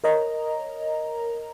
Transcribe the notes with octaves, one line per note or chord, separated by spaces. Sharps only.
A#4 C#5 D#5 A#5